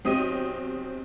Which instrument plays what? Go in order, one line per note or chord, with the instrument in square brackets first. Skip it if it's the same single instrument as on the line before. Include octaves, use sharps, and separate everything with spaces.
[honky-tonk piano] B1 C4 G4 D#5 D#6 D#7